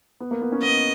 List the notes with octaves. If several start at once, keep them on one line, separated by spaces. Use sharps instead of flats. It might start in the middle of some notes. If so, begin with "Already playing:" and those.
B3
A#3
B3
C#4
B3 D#5